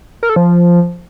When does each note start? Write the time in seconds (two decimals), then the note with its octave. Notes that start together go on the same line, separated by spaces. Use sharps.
0.23 A#4
0.29 A4
0.36 F3